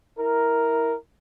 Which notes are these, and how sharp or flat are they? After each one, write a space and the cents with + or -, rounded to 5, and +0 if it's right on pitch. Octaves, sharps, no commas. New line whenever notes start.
E4 -15 A#4 +0